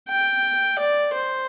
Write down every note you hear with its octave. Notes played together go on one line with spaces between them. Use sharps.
G5
D5
C5